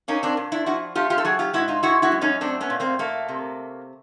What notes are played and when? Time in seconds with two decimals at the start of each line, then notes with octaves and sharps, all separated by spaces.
0.08 A#3 C#4 D#4
0.23 C4 D4
0.37 A#2
0.52 D4 E4
0.66 F3 E4 F#4
0.95 A3 F4 G4
1.10 F4 G4
1.18 A4
1.25 F#3 F#4 G#4
1.39 F4 G4
1.54 G#2 E4 F#4
1.68 D#4 F4
1.83 G#3 E4 F#4
2.02 E4 F#4
2.12 F#2
2.21 C#4 D#4
2.41 A3 C4 D4
2.61 B3 C#4
2.70 A#2
2.80 A#3 C4
2.99 A3 A#3
3.28 C3